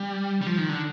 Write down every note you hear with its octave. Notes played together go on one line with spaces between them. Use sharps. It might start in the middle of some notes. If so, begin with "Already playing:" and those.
Already playing: G3
G3
F3
D#3
D3